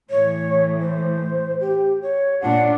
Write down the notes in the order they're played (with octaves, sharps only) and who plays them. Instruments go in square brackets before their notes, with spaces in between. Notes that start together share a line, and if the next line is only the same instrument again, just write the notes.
[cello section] A2 E3 [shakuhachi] C#5
[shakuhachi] C5
G4
C#5
[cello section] A#2 D4 F4 [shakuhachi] F#5